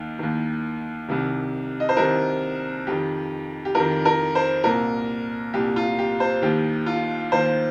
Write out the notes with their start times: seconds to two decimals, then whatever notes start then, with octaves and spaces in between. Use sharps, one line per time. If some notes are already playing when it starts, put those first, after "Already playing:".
Already playing: D#2 D#3
0.19 D#2 D#3
1.08 C2 C3 D#3
1.80 D#5
1.89 C5
1.97 C2 C3 D#3 A#4
2.87 F2 D#3 G4
3.65 G4
3.75 F2 D#3 A#4
4.05 A#4
4.35 C5
4.64 C2 A#2 A#4
5.54 C2 A#2 G4
5.76 F4
5.99 G4
6.20 C5
6.42 D#2 D#3 G4
6.86 F4
7.32 D#2 D#3 C5